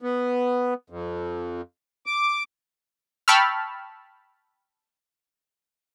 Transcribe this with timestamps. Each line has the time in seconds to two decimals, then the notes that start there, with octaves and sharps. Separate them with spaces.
0.02 B3
0.90 F2
2.06 D6
3.28 G5 A5 B5 C#6 E6 F6